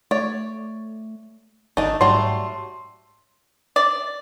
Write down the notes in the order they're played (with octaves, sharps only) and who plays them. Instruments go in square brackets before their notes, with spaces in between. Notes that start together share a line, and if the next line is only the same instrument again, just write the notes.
[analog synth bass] A3 [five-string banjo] C#5 D5
[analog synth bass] G#1 [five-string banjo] A3 D4 D#4
[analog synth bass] G#2 [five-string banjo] F#3 G3 A3 [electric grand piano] C6
[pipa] D5